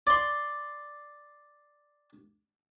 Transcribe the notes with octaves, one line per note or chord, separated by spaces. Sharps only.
D5 C6